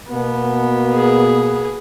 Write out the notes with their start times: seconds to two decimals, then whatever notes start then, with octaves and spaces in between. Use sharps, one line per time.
0.11 B2 A#3 B3
0.94 G#4